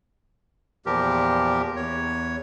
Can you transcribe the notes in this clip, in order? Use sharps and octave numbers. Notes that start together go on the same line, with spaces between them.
E2 A#2 F3 G4 A#4
E2 C#5